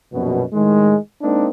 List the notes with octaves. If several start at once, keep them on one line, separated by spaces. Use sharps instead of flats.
A#1 F#2 B2
A2 D#3 G#3
G#3 A#3 C4 D4 D#4